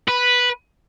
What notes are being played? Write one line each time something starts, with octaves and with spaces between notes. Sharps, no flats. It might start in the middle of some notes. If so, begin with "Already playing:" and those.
B4